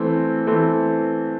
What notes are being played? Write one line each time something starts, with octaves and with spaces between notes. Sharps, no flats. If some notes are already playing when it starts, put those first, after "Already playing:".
Already playing: E3 A3 C4
E3 A3 C4